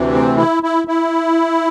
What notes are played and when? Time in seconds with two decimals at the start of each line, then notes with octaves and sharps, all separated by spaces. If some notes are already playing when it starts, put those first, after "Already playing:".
Already playing: D2 C3 E3
0.13 C4
0.37 E4
0.63 E4
0.88 E4